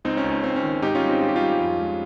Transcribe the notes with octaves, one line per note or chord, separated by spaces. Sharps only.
C#2 C4 D#4
C#4
C#2
C#4
C#2 C4
C#4
D#3
G#2 D#4 G4
C#4 F4
G3
C4 D#4
G3 F4
G4
G3 C#4 F4
F2
G#3